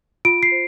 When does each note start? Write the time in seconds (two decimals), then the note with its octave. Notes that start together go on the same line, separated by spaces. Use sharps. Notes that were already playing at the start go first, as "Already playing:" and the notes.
0.25 F4 D7
0.43 C7
0.52 C5